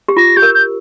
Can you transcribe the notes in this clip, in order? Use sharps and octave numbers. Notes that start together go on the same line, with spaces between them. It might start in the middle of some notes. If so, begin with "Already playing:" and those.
G4
F4 A#6
G4 G6
A#4
G6